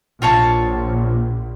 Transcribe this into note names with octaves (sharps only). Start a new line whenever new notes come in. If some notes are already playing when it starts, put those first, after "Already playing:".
A#1 A#2 F4 C#5 A5